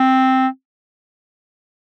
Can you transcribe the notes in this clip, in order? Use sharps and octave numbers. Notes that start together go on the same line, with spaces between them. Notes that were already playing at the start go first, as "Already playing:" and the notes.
Already playing: C4